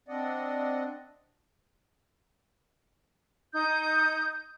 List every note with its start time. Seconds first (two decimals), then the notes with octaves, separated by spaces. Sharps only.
0.09 C4 D4 D5 D#5 F#5
3.53 D#4 D#6 G6